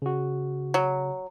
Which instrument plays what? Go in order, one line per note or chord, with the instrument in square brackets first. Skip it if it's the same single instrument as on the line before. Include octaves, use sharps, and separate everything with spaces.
[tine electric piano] C#3 F#4
[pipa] F#3